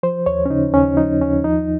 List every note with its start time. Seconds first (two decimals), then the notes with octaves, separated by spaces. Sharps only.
0.03 F3 C5
0.26 D#2 C#5
0.46 C#4
0.50 C#3 D#4
0.73 D#2 C#4
0.97 F3 D#4
1.21 D#2 C#4
1.44 F3 D#4